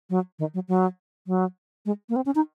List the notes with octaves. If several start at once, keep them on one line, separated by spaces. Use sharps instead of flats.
F#3
D#3
F#3
F#3
F#3
G#3
A#3
C4
C#4
D#4